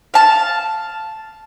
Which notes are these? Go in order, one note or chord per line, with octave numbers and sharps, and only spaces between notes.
F5 A5